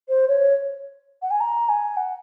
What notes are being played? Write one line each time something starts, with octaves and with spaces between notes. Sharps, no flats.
C5
C#5
F#5
G#5
A#5
G#5
F#5